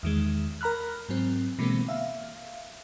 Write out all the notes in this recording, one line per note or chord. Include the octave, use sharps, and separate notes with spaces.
E2 D#3 G#3
A#4 A#5 B5 F6 F#6
G#2 F#3 C4
B2 D3 E3 G#3 A#3 C4
E5 F5